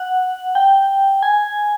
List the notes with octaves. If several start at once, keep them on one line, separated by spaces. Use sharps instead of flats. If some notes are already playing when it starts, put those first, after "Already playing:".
Already playing: F#5
G5
G#5